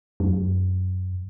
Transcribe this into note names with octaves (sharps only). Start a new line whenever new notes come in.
F#2